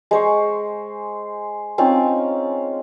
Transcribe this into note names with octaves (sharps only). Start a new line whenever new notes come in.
G#3 C5 C#6
C4 C#4 D#4 F4